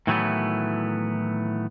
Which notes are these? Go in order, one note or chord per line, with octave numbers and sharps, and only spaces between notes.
A2 D#3 E3 F#3 A3 B3